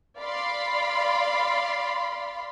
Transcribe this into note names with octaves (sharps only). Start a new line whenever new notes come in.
D5 F5 B5 C6